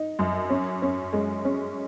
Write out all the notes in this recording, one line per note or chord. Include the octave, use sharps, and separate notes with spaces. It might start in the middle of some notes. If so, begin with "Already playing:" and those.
Already playing: D#4
F#2
C#4
C#4
G#3
C#4